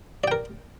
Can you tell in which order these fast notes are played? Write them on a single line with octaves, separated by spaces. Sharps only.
D5 G5 A#4